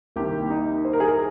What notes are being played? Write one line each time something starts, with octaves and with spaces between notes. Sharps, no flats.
C2 C3 D#3 A#3 G4
D#4
C5
A#4
G#4
A#4